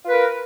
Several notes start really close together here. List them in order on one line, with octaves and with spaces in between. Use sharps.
F4 B4 A#4